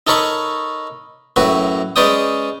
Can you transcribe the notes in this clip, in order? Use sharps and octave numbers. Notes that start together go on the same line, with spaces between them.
D#4 A4 A#4 C#5 B5 C#6
F#2 A2 F#4 B4
G#3 C#4 B4 D5 G5 D#6